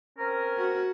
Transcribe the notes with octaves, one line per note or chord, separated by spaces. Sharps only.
C4 C#4 A#4
F#4